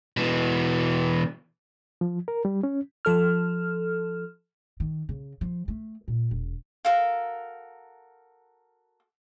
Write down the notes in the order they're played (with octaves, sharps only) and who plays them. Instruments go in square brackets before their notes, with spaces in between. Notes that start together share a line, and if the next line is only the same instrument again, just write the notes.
[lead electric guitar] B2 E3
[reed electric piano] F3
A#4
G3
C#4
[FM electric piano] F3 A4 F6
[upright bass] D#3
C#3
F3
A3
A#2
E1
[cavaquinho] F#4 A4 A#4 F5